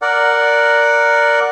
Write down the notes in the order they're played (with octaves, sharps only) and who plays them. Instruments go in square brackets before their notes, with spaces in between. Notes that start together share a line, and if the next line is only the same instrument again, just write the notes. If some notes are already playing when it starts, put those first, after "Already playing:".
[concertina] A#4 D5 F#5